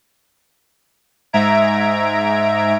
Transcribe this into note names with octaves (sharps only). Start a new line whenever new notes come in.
G#2 E5 A#5 G#6 D7